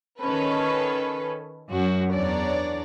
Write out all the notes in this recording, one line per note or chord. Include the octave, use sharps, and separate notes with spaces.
D#3 C#4 A4 B4
F#2 F#4
E2 D4 C#5 D5 A#5